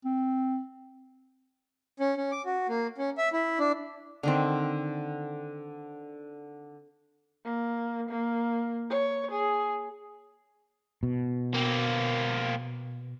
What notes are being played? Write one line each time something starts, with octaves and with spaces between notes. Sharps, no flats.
C4
C#4
C#4
D6
F#4
A#3
C#4
E5
E4
D4
D3 D#3 C4
A#3
A#3
C#5
G#4
B2
A#3 C4